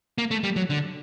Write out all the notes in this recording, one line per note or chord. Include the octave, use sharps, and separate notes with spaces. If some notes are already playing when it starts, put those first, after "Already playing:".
A#3
A3
G3
F#3
D3